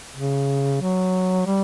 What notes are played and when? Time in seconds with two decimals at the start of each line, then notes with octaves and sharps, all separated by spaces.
0.16 C#3
0.81 F#3
1.46 G3